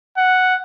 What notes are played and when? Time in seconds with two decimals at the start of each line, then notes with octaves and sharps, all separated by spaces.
0.18 F#5